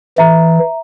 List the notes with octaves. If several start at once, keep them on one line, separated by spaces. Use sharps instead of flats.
E3 E5 A#5